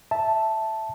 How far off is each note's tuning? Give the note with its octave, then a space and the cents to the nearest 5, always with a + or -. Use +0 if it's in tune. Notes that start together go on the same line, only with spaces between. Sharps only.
E5 +0 A5 +0